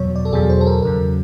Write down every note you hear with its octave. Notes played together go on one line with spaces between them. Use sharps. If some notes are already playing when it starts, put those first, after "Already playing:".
Already playing: E2 B2 F#3 C#5
D5
A4
E2 B2 F#3 G#4
C5
A4
A#4
E2 C#3 F#3 A#4